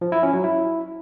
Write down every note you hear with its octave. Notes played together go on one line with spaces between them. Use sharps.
F3
E4
C#4
F#3
E4